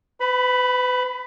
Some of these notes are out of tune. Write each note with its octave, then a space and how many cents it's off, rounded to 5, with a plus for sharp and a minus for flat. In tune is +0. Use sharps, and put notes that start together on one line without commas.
B4 +35 B5 +0